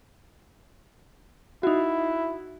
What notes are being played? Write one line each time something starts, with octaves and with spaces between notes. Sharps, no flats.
D#4 E4 F#4